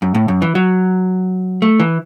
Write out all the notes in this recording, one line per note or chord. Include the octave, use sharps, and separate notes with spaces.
F#2
A2
F#2
E3
F#3
A3
E3